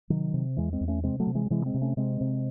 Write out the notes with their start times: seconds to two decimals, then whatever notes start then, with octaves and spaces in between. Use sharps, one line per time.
0.10 C3 D#3 F#3
0.34 C3
0.57 E2 E3 G#3
0.73 G#3 C4
0.81 E2
0.88 A3 C#4
1.03 C3 G#3 C4
1.20 F#3 A3
1.27 C3
1.35 E3 G#3
1.46 F#3
1.50 C3 E3 G#3
1.66 G#3 C4
1.74 C3
1.82 A3 C#4
1.97 C3 G#3 C4
2.21 C3